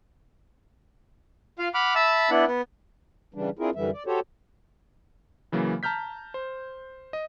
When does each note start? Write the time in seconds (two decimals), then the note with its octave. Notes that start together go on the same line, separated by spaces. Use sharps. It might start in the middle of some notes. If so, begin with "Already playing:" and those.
1.59 F4 F5
1.74 F#5 B5 D6 F6
1.95 E5 A5 B5 E6
2.31 B3 D4 E4 F#5
2.47 B3
3.34 C#3 E3 G3 D4
3.59 C4 D4 E4 F4 G#4 A#4
3.75 F#2 D3 E3 G3 E5
3.93 D5
4.06 F#4 G4 A4 C5 C#5
5.52 C#3 E3 F#3 A#3
5.83 A5 A#5 F6 G6 B6
6.34 C5
7.13 D#5